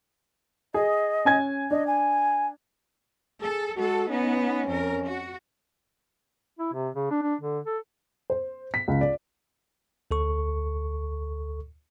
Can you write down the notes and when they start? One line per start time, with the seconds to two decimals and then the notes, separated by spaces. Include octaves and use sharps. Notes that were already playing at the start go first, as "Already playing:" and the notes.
0.74 G#4 D#5
1.25 C#4 G#5 G#6
1.71 D4 D#5
1.87 G#5
3.42 G#4 A4
3.77 G#3 F#4 A4
4.10 B3 C#4 D#4
4.67 F2 A#4
5.06 F#4
6.59 E4
6.73 C3
6.95 C#3
7.11 D4
7.22 D4
7.41 D3
7.65 A4
8.30 C5
8.74 B6
8.88 C#2
9.01 D5
10.11 D2 A4 C#6